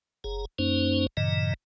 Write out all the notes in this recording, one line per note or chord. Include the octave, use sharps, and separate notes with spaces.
F#1 G#4 A#5
F#2 A#3 C#4 D#4 C5
G2 A#2 C#3 E3 D#5 A#5